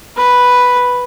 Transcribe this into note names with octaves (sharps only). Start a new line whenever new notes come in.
B4